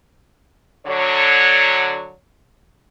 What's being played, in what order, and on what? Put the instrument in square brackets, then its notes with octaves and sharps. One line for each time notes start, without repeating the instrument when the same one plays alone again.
[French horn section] D3 F#3 C#5